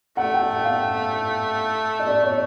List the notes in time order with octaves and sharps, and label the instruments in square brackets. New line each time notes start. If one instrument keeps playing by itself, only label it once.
[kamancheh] A3 [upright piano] F#5
[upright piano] G5
F#5
F5
D#5
D5
C#5